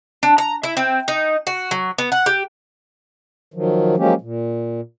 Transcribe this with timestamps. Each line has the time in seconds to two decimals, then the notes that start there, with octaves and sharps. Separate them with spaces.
0.23 D4
0.38 A#5
0.63 E4
0.77 C4
1.08 D#4
1.47 F#4
1.71 F#3
1.98 B3
2.12 F#5
2.26 G4
3.54 D#3 F3 F#3
3.97 F3 F#3 G#3 A#3 C#4 G4
4.21 A#2